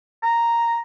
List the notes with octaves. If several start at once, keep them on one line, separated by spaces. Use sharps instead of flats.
A#5